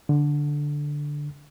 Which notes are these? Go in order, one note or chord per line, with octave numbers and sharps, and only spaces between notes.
D3